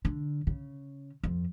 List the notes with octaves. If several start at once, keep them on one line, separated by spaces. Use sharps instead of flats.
D3
C#3
F2